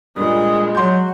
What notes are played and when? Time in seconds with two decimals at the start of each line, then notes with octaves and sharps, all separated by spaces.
0.16 G2 A#2 G#3 D#6
0.75 F#3 F#4 C6 G6